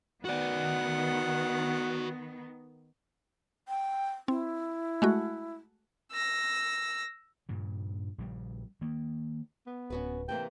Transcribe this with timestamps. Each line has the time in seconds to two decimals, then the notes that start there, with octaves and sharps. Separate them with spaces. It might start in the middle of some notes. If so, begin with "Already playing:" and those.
0.25 D#3 B3 F#4 D5 F#5
3.68 G5
4.28 C4 E4
5.02 G#3 A3 F#4
6.12 E6 A#6
7.49 G2 A#2 C#3
8.18 A#1 C#3 G3
8.81 D#3 A#3
9.67 B3
9.90 D1 C#4 F#4 B4
10.29 C3 E3 A#3 G5